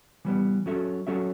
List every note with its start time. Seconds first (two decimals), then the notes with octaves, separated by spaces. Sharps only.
0.25 E3 G3 B3
0.66 F#3 C#4 F#4 A4 E5
1.07 F#3 C#4 F#4 A4 E5